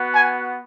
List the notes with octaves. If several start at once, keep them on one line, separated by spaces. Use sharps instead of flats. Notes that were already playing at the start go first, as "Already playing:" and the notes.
Already playing: B3 F#4
G#5